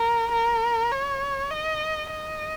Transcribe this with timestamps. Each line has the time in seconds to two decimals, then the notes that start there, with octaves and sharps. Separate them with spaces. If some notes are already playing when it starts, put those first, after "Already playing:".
Already playing: A#4
0.32 A#4
0.92 C#5
1.51 D#5
2.11 D#5